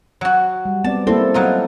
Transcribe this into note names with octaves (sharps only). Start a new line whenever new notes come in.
F#3 F#4
G3
B3 C4 D5 A5
A#3 C4 E4 A4
F#3 D#4 F4